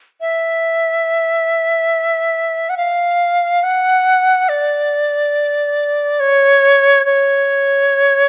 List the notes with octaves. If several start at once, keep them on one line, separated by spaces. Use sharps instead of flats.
E5
F#5
F5
F#5
D5
C#5
C#5